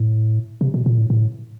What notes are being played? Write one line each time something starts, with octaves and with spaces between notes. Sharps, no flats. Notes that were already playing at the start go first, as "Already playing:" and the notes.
Already playing: A2
C3
B2
A#2
A2
A2